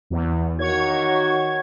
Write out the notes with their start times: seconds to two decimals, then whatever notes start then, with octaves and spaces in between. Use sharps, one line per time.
0.10 E2
0.59 D#3 A#3 F#4 C#5 G#6